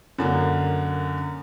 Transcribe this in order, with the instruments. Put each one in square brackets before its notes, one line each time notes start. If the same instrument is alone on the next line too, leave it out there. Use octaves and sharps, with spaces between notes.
[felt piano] F#2 D3 A#3